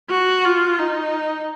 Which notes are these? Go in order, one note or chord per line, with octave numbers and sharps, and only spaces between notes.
F#4
F4
D#4